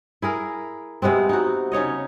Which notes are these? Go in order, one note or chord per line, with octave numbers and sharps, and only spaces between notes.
E4 G#4 A#4
C3 G#3 B3 C4
D#4 F#4
C#3 D#4 C#5 D#5